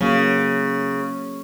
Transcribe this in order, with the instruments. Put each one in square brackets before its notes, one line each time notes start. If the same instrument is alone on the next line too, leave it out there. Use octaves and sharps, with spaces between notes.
[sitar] C#3 [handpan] F#3 A#3 F#4